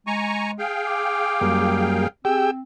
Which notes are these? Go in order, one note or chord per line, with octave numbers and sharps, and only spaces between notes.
G#3 G#5 A#5 C#6
G#4 F5 G5
D6
F#2 G3 A#3
C4 G4 G#4 G5 E6